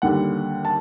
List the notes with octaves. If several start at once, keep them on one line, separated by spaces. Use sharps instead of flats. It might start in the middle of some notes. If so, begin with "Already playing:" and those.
D#2 D3 G3 F#5
A5